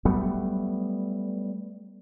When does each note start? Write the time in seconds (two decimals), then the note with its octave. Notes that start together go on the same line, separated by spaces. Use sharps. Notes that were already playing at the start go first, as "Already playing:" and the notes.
0.05 F#3 G3 A3 B3